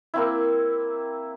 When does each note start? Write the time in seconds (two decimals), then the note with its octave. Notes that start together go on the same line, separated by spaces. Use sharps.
0.14 A#3 C4 E4